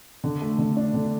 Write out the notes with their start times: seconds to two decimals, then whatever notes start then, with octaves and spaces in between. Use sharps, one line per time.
0.24 D3
0.41 A3
0.59 D3
0.77 D4
0.94 D3